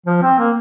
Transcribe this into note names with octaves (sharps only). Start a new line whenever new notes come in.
F3
C4
A#3